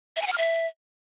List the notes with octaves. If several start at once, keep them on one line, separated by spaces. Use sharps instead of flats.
E5
G#5
F#5
F6
E5